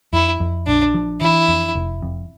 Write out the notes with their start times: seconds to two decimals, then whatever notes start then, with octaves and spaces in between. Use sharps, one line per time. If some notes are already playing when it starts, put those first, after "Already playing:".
0.13 F2 E4
0.40 F2
0.67 A#1 D4
0.94 F3
1.21 E3 E4
1.48 F2
1.75 F1
2.02 F2